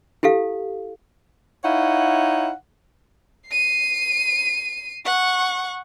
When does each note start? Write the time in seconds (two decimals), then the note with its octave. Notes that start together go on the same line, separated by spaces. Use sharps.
0.23 E4 G4 A4 F5
1.64 D#4 E4 C#5 F5 F#5
3.49 C7 D#7
5.05 F#5 C#6